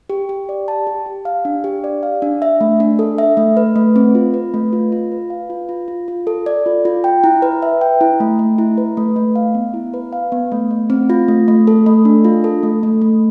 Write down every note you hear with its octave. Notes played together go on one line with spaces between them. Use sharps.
G4
G4
D5
A5
G4
G4
F5
D4
G4
D5
F5
D4
E5
A3
D4
A4
E5
A3
B4
A3
C4
F4
B4
A3
F4
F4
B4
F5
F4
F4
F4
F4
A4
D5
F4
F4
G5
E4
B4
E5
G5
E4
A3
A3
E4
B4
A3
A3
F5
B3
E4
B4
F5
B3
A3
A3
C4
F4
A3
A3
A4
A3
D4
F4
A4
A3
A3
A3